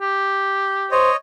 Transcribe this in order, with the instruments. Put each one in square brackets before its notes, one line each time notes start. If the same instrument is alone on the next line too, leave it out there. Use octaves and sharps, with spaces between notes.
[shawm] G4
[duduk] C5 [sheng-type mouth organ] C#5 D#5